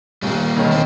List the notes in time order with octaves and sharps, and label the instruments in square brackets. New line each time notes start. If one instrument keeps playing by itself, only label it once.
[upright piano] A#1 D#2 [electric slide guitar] G3 A#3
[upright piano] E1 D#3 C#5
[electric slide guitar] A3 C4